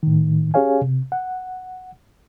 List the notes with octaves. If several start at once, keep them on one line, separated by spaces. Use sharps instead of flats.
A2 D#3
C#4 G4 G#4 C#5 F5 G#5
C3
F#5